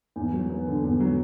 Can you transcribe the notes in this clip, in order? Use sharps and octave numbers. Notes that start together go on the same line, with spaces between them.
E2
F#3
B3
D3
E2
F#3